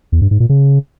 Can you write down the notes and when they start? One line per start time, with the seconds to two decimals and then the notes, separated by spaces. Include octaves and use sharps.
0.12 E2
0.22 G2
0.31 G#2
0.40 A#2
0.49 C#3